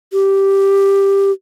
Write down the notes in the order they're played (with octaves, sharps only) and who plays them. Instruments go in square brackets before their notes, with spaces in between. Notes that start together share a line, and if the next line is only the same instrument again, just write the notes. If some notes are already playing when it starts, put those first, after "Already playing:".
[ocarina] G4